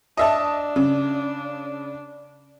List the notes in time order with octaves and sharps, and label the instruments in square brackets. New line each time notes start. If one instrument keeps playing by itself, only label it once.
[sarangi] D4 [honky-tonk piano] D#5 E5 A5
[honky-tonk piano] C#3